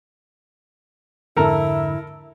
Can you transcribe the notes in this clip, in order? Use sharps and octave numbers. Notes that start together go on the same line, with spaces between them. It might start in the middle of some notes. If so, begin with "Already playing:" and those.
F2 G#2 D3 E4 A4 A#4 A#5